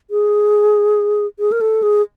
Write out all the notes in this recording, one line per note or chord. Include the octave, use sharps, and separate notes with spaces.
G#4
G#4
A#4
A4
G#4